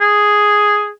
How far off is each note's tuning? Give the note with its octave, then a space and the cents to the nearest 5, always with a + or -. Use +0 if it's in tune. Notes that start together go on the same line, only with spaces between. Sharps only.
G#4 +0